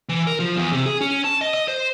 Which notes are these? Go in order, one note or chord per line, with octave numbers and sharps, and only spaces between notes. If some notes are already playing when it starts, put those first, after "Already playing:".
E3
A#4
F3
E2
C3
G#4
C#4
A5
D#5
D#5
C5